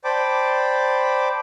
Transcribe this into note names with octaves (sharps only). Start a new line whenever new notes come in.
C5 D5 G5 A5 B5 D6